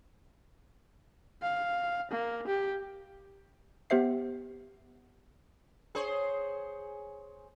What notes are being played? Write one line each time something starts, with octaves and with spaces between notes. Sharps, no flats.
F5
A#3
G4
B3 G4 C5 E5 C7
G#4 C5 C#5